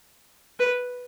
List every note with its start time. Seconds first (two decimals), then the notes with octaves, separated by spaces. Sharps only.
0.59 B4